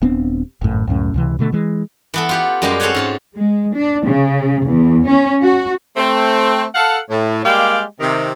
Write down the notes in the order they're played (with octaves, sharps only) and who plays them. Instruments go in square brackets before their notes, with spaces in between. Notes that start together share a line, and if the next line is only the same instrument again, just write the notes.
[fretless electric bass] D#1 B3 C4 D4
G#1 F#2 A2
C#2 F#2 A2 C#4
C#2 C3 E3
B2 D3 A3
E3 G#3
[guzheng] E3 B3 A4
F4 G4 F#5
F#2 G3 G#3 G4 D5 F5
C4 A4 C#5 F5 F#5 G#5
G#2 F4 A5
[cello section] G#3
D4
C#3
E2
C#4
F#4
[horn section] A3 C4
A4 F5 F#5
A2
G3 G#3 A#3 G4 D5 F5
C3 D#3